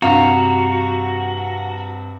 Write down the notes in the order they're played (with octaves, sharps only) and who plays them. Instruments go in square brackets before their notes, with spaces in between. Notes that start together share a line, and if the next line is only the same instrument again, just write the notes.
[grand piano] G2 C3 [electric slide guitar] F#4 [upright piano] F5 [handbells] A#5